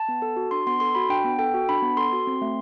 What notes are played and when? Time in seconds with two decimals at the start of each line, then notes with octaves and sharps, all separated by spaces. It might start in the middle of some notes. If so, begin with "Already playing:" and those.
Already playing: A5
0.09 B3
0.22 A4
0.37 F#4
0.51 D4 C6
0.67 B3 C6
0.80 A4 C6
0.95 F#4 B5
1.09 D4 G5
1.24 B3
1.39 A4 G5
1.54 F#4
1.69 D4 B5
1.82 B3
1.97 A4 C6
2.13 F#4
2.27 C4
2.42 A3